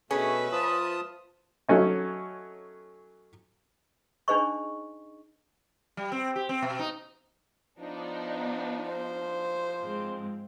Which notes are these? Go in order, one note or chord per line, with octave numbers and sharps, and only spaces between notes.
B2 A3 C#4 G#4 B4 E5
F3 F4 A5 D#6
F#3 A3 C#4 D#4
D4 D#4 G#4 C5 D#5 C#6
G3
C4
G4
C4
B2
D#4
F3 B3 D4 D#4
C5
G#2 G#3 C4